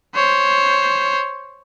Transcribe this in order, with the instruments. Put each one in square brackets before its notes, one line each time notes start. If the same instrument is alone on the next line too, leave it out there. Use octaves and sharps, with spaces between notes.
[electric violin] C5 C#5